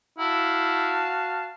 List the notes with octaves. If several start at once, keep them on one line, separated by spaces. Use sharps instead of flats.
E4 F#4 F5 A5